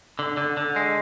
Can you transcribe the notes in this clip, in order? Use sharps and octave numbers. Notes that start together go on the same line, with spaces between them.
D3
D3
D3
G#3